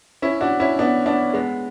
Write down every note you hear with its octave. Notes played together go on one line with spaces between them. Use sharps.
C#4 E4
D4 F#4
C#4 E4
B3 D4
B3 D4
G#3 B3